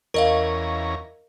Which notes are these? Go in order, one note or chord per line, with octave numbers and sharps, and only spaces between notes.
E2 C#4 A#4 D#5 F5 A#5